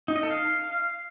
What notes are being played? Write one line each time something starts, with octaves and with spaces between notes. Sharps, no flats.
D#4
D#5
A4
F5